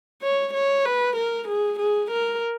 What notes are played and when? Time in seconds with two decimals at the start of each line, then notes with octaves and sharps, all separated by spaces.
0.22 C#5
0.54 C#5
0.85 B4
1.16 A#4
1.48 G#4
1.80 G#4
2.11 A#4